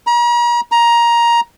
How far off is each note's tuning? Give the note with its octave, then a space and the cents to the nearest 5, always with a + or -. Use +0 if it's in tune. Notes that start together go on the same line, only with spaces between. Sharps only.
A#5 +40
A#5 +15